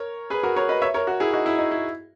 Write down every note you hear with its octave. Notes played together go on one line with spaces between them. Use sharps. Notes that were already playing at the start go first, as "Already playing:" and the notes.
Already playing: A#4 C#5
G#4 B4
F#4 A#4
A#4 C#5
B4 D#5
C#5 E5
A#4 C#5
F#4 A#4
E4 G#4
D#4 F#4
E4
D#4
E4